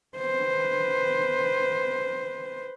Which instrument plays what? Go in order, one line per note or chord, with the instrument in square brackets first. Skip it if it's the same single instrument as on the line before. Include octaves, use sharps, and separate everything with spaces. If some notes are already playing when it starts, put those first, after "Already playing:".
[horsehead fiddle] B4 C5